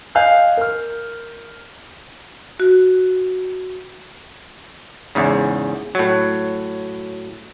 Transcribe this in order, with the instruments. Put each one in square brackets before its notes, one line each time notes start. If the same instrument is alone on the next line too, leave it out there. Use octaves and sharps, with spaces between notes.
[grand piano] D#5 F5 G#5 F#6 G6
A#4 F6
[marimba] F#4
[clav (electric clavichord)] E2 G#2 C#3
A2 F#3